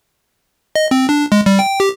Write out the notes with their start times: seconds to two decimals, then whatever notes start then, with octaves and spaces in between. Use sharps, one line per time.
0.76 D#5
0.91 C4
1.09 D4
1.32 G#3
1.46 G3
1.59 G5
1.80 G4